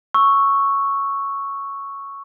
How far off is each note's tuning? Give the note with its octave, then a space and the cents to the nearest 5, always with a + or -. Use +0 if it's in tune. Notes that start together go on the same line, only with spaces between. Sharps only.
C#6 +0 E6 +0